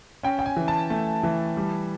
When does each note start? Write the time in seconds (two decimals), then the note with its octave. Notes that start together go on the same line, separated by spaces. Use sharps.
0.23 C#4 G5
0.39 G5
0.46 G#5
0.57 E3
0.68 A5
0.90 A3
1.23 E3
1.57 G3